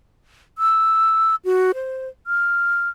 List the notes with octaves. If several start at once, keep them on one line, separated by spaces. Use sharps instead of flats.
E6
F#4
C5
F6